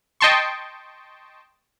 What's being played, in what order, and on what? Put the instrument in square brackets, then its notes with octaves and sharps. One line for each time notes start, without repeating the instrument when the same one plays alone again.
[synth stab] D#5 G5 A5 C6 C#6